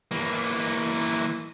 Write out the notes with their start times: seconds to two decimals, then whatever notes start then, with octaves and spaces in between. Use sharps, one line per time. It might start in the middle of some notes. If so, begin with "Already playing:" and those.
0.11 E3 A#3